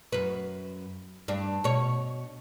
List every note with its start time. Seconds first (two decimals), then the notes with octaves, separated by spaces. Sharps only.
0.12 F#2 B4
1.28 G2 D4
1.64 B2 C#5